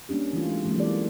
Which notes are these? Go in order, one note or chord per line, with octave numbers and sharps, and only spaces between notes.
G3 A#3 C#4 D4 G4
E3 G3 A3 F4
G#3 D#4
E3 F#3 G#3 A#3 C4
E3 G#3 A#3 G4 A4 D5